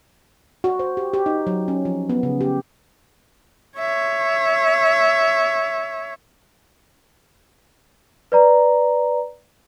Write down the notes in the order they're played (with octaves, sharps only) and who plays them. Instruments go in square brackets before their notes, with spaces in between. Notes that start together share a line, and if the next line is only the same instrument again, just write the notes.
[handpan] F#4
C5
G4
G4
D#4
F#3
C#4
F3
B3
C#3
G4
[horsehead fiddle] C#5 E5
[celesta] B4 D5 A#5